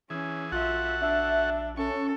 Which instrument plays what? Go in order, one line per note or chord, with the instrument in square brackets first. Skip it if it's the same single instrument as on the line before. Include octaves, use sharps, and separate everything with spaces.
[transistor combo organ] E3 G#4 [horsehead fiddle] C#4
[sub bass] A#1 [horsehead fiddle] F4 E5 [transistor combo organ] F#4 A4 F#5
[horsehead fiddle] D4 [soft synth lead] E5
[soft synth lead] C#4 [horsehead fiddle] A4 [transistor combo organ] C#6